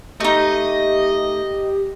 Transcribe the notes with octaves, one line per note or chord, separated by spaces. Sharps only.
A3 D#4 G4 D#5